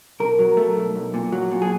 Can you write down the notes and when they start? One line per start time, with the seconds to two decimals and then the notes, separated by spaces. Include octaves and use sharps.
0.20 B1 A#4
0.39 F#3
0.57 A3
0.76 B1
0.96 B1
1.14 A#2
1.32 F#3
1.51 A#2
1.62 G#4